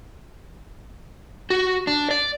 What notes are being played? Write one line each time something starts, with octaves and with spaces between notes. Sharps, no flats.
F#4
D4
D5